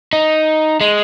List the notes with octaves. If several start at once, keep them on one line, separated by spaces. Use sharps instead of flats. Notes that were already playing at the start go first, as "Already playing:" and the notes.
D#4
G#3